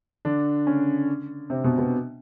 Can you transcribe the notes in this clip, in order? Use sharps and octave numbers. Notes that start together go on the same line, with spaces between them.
D3 D4
C#3 C#4
C3 C4
B2 B3
B2 B3